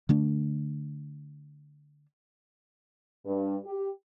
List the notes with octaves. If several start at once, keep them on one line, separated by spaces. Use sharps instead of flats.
D3 A3 D4
G2
G4